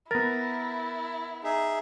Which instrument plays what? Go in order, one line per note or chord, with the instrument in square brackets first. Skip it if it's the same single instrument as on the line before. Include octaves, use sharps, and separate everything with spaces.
[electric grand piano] B3 A#4 [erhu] E4 [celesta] A6 A#6
[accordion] D#4 G#4 E5